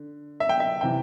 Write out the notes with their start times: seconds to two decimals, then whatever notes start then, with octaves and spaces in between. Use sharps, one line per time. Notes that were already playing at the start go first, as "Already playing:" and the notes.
Already playing: D3
0.40 E5
0.49 G5
0.60 E5
0.81 C3 E3 G5